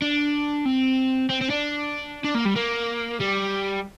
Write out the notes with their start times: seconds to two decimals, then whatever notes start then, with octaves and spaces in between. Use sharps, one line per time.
0.02 D4
0.66 C4
1.29 C4
1.41 C4
1.50 D4
2.24 D4
2.35 A#3
2.46 G3
2.56 A#3
3.20 G3